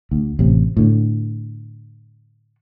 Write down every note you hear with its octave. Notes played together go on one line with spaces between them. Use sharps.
D2
A1 C3
A2 D3